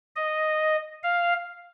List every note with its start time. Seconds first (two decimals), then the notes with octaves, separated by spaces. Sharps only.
0.16 D#5
1.03 F5